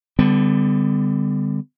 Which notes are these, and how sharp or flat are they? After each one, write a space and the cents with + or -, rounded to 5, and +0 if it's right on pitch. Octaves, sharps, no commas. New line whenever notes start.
D3 +0 G3 +20 B3 +45